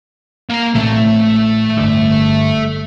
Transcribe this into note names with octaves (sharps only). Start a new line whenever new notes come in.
A#3 A#5
A2 E3 A3 C4
G1 D3